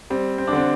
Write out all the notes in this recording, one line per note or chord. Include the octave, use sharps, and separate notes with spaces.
G3 C4
C4
D4
D3 C4